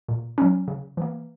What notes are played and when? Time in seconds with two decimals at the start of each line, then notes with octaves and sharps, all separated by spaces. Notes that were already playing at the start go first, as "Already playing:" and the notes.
0.08 A#2
0.38 F#3 C#4
0.68 C#3
0.97 E3 A#3